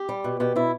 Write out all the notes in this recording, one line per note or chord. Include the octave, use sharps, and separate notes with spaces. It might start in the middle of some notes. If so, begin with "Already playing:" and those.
Already playing: G4
G3
B2
B2 G4
B2 E4